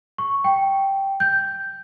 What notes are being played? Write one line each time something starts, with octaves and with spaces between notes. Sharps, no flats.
C#6
G5
G6